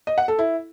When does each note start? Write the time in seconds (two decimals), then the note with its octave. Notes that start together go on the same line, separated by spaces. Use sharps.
0.07 D#5
0.18 F#5
0.28 A4
0.39 E4